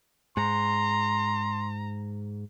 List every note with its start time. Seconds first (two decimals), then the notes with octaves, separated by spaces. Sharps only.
0.37 G#2 A#5 C6